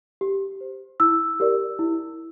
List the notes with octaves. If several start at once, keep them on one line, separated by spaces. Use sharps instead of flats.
G4
C5
E4 E6
G4 A#4 D5
E4